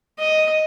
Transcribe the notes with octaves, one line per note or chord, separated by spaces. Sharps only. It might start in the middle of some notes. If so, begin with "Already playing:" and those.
D#5